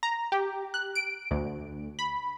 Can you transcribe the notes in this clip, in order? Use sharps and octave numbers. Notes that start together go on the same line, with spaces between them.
A#5
G4
F#6
D7
D2
B5